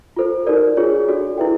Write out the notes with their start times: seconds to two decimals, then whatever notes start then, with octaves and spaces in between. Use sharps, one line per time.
0.16 F4 A4 C5
0.47 D#4 F#4 A#4 D5
0.77 D4 F4 G#4 C#5
1.08 D4 F#4 A4 D5
1.38 E4 G#4 B4 E5 G5